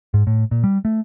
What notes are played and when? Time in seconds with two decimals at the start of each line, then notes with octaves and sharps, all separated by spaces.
0.14 G#2
0.27 A2
0.51 A#2
0.64 G3
0.85 A3